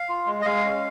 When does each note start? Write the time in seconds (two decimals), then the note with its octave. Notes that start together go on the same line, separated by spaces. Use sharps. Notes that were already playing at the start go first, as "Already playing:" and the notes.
Already playing: F5
0.09 F4
0.27 G#3
0.41 D#5
0.45 G#3 F5
0.65 C#4